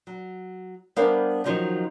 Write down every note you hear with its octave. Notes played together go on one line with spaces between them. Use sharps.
F#3
G3 B3 D4 A#4 C5 F5
D#3 F3 F#3 C#4 D#4